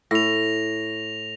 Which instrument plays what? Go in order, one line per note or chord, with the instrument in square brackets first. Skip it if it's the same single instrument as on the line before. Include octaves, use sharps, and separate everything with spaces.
[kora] A2 [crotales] A#6 F7